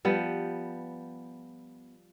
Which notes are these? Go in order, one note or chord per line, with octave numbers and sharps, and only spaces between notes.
F3 G3 B3